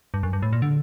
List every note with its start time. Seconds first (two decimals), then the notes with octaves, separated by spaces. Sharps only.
0.14 G2
0.23 F#2
0.33 G2
0.42 A2
0.53 A#2
0.62 D3